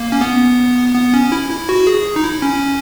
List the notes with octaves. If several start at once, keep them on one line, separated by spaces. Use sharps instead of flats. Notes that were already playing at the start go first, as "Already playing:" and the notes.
Already playing: A#3
C#4
B3
B3
C#4
E4
E4
F#4
G#4
D#4
E4
C#4